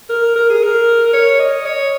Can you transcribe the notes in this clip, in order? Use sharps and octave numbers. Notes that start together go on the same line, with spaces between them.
A#4
A#4
G#4
A#4
C#5
D#5
C#5